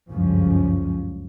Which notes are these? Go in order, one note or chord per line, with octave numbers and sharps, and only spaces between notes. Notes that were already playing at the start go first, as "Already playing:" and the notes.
F#1 C#2 G2 F3 C#4